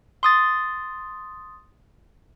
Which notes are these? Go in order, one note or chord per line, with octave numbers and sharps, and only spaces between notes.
C6 D#6 A6